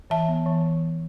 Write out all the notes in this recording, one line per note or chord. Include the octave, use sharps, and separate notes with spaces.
E3 E5 A5
B3
E3